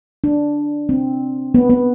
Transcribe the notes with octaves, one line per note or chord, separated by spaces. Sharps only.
D4
C4
B3
B3